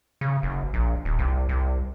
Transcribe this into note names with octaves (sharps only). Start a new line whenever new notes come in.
C#3
F#1
A#1
D#1
C2
C2